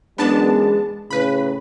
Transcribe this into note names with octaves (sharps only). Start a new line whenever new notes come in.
F#2 E3 G#3 B3 D4 A5
A2 C#3 B4 B5